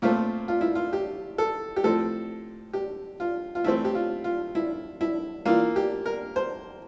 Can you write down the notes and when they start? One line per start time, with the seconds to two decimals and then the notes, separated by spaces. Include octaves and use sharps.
0.02 A#2 A3 C4 F4
0.48 F4
0.61 E4
0.75 F4
0.93 G4
1.38 A4
1.76 G4
1.84 A2 F3 C4 A4
2.73 G4
3.20 F4
3.55 F4
3.64 E3 A3 C4 E4
3.85 G4
3.95 F4
4.24 F4
4.55 E4
5.01 E4
5.46 E3 A#3 F4
5.76 G4
6.06 A#4
6.36 C5